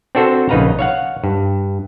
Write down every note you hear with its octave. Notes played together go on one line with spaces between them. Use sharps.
C4 D4 F#4 A4 C5
A#1 C#3 D#4 B4 F5 A#5
C#5 F5 F#5
G2